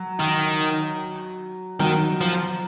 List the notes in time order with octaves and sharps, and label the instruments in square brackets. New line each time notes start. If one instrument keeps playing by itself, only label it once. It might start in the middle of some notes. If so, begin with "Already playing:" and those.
Already playing: [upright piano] F#3
[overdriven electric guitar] D#3
[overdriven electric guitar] D#3 [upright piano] F#3
[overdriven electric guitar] F3